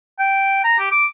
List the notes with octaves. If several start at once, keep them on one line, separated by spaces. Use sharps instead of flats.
G5
A#5
G4
D6